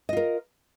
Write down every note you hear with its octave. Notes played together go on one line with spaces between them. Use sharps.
F4 A#4 D#5